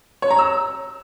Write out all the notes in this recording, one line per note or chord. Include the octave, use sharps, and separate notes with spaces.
C#5
A#5
E6